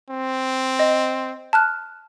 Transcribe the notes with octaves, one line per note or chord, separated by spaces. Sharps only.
C4
D#5
A5 F6 F#6